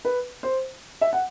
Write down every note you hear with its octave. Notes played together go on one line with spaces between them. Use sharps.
B4
C5
E5
F#5